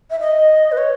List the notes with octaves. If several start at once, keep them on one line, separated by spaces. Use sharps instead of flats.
E5
D#5
B4
C#5